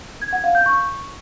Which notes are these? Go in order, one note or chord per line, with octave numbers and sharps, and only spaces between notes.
G#6
F#5
F5
G6
C#6